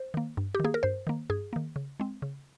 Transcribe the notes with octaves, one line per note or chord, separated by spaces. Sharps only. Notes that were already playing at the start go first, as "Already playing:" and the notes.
Already playing: C5
D#3 A#3
G2
G4
D#3 A#3 G#4
A#4
G2 C5
D#3 A#3
G2 G#4
D#3 A#3
C#3
G#3 C4
C#3